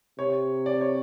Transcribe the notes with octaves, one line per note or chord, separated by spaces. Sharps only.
C3 C#5
D5
C#5